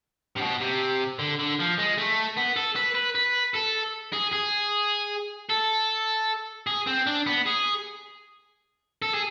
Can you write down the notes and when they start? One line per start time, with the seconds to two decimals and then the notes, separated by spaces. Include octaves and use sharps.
0.37 C3
0.42 B2
0.61 C3
1.19 D3
1.39 D3
1.59 F3
1.78 G#3
1.98 A3
2.37 B3
2.56 A4
2.76 B4
2.95 B4
3.15 B4
3.54 A4
4.13 G#4
4.33 G#4
5.50 A4
6.67 G#4
6.87 C4
7.06 D4
7.26 B3
7.46 G#4
9.02 A4
9.14 G#4